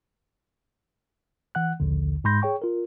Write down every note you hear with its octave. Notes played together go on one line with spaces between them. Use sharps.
E3 F#5 F#6
A#1 D#2 D3
G#2 G#3 B5 C6 G6 A#6
G#4 C#5 G5 C#6
F4 A#4